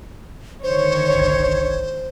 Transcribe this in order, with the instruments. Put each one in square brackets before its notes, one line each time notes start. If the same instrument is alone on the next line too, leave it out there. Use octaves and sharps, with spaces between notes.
[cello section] D3 D#3 C#5 [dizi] C5
[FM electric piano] G1 C2 G#6